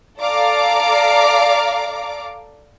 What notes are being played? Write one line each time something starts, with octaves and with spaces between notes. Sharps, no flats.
A4 D5 F5 A#5 D6